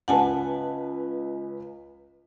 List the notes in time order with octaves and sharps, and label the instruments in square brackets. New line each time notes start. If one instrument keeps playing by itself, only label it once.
[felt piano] C#2 C#4 B4 [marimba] F#5 G#5 A5